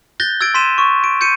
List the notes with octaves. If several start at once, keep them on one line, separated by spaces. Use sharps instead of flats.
F#6 G6 A6 A#6 G7
E6 G#6 A6 D7
C6 B6 D#7 E7
C#6
D7
G6 C#7 D#7